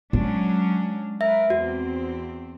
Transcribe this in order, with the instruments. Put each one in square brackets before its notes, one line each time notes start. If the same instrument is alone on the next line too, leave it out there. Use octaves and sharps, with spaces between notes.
[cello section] F#3 C#4 D4 [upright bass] G#3
[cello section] A#4 B4 [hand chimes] E5
[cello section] E2 C4 [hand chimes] F#4